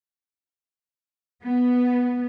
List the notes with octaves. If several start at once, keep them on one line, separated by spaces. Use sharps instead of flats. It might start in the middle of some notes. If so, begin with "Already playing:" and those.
B3